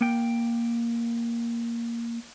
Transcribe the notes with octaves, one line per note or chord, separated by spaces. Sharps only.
A#3 G5